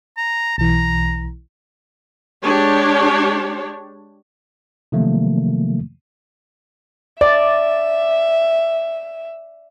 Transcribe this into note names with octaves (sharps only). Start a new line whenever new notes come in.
A#5
B1 E3 A#5
G#3 D4 G4 C#5
C3 D#3 F3 F#3 A3 A#3
D5 E5